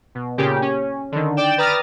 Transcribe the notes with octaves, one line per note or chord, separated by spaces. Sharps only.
B2
A#2 C#3 G4
C#4
D3 D#3
D5 G5 E7
B4 D5 A#5 D#6 F6 A6